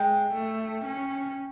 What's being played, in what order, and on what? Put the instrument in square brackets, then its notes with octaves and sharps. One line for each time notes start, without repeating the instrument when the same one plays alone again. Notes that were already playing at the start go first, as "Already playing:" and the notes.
Already playing: [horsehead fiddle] G#3 [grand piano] G5
[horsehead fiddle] A3
C#4